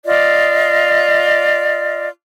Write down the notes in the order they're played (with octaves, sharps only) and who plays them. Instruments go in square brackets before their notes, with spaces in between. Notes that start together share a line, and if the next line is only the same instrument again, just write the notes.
[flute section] F4 D5 D#5